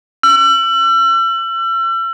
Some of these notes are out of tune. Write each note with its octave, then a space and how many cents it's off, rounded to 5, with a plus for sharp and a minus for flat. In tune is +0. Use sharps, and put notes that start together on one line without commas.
E6 +40